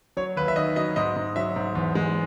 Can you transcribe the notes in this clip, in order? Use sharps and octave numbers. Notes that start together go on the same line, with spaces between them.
F#3 C#5
D#2 B4
E5
D#3 D#5
F#3 D#5
G#2 D#5
G#2
F#3 E5
G#2
E2
G#3